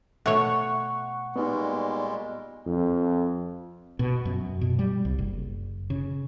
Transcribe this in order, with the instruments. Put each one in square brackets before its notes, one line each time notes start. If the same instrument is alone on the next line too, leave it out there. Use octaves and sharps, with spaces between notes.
[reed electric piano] B2 [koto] A3 C#5 [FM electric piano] F#5 C#6
[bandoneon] A#2 G3 G#3 [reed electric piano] B3 D#4
[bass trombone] F2
[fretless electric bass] B2
F#2
B2
G3
C2
F#1
C#3